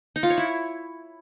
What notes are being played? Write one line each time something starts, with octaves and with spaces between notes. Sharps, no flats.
D#4
F4
C#5
E4